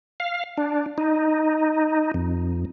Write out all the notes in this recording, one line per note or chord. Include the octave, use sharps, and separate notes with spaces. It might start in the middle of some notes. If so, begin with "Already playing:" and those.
F5
D4
D#4
F2